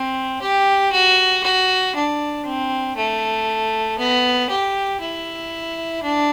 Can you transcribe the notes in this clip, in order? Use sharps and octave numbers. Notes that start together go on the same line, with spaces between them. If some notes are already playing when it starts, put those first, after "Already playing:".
Already playing: C4
G4
F#4
F#4
D4
C4
A3
B3
G4
E4
D4